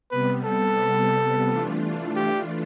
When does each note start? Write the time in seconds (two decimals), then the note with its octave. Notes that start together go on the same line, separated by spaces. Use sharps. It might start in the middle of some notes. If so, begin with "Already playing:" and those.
0.10 C3 G3 B3 B4
0.45 A4
1.47 E3 A3 D4 F4
2.16 G4